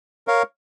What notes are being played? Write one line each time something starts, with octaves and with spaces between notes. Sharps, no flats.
A#4 C#5 F5